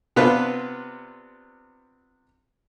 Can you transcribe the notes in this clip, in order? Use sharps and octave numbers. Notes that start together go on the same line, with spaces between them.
C3 B3 D4 F4 B4 F#6